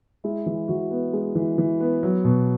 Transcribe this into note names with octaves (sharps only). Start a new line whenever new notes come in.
G#3 E4
E3
E3 F#4
B3
G#3
E3
E3
B3
F#3
B2